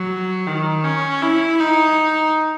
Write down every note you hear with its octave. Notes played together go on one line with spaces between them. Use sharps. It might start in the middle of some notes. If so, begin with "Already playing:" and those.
Already playing: F#3
D#3
C#4
E4
D#4